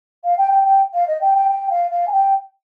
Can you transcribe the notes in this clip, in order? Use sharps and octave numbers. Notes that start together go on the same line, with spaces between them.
F5
G5
G5
G5
F5
D#5
G5
G5
G5
F5
F5
G#5
G5